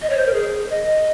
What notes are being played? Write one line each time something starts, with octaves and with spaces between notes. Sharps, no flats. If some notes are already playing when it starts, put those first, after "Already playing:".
D#5
C#5
C5
A#4
G#4
D#5